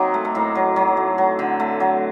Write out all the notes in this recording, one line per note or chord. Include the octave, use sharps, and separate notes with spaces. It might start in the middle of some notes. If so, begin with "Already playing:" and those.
Already playing: F#3 A#3 C4 D#4
A3
A3
A2 A#3
F#3
F#3
A3
F#3
D3
A3
F#3